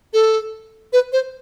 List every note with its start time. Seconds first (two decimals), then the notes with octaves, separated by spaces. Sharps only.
0.13 A4
0.93 B4
1.12 C5